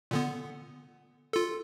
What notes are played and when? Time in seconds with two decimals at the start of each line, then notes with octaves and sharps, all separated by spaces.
0.11 A#2 D3 B3
1.33 F4 A4